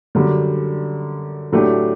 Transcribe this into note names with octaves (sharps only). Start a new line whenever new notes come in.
F#2 D3 G3
A2 F#3 A3 D4 G4